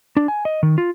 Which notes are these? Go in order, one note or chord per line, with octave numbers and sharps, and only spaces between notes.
D4
G#5
D#5
D#3
F4